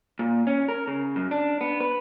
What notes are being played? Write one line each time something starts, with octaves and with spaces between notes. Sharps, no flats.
A#2
C#4
A#4
C#3
F#2
D4
B3
B4